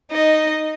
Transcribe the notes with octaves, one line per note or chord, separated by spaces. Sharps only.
D#4 D#5